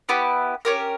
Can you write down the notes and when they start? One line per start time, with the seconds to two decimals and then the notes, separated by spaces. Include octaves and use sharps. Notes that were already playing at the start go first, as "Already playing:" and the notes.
0.09 B3 E4 G4
0.65 C#4 G4 A#4